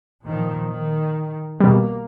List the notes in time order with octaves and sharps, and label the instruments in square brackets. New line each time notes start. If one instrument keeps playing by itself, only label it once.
[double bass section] A#2 D#3 F3
D#3
[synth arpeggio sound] B2 G3 [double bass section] A#3